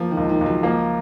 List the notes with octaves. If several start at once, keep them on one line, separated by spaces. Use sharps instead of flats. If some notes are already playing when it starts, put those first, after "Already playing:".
Already playing: F3 A#3
D#3
C#2
D#3
C#2
F#3
F3 A#3